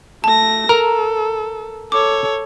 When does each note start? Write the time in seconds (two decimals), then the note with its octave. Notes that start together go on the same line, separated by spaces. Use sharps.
0.24 A3 A5 A#6
0.69 A4 A#4 A#5
1.92 A4 C#5 D6